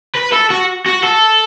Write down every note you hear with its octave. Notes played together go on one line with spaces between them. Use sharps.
B4
A4
F#4
F#4
A4